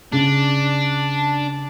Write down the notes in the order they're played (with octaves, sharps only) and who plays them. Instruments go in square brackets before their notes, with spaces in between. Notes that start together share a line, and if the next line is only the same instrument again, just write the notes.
[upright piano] C#3 [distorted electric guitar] D4